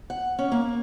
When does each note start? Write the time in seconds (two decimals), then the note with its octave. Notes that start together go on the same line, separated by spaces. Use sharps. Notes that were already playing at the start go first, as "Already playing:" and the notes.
0.10 F#5
0.39 C#4
0.52 A#3